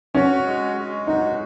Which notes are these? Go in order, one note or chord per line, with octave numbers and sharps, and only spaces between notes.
C#4 F#4
G#3
G#3
D#4 F#4